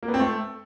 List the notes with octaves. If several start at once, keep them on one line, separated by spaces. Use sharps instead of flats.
A#3
B3
C4
A3